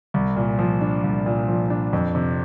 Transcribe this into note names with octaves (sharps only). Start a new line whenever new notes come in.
C2
A#2
F3
D4
C2
A#2
F3
D4
F2
C3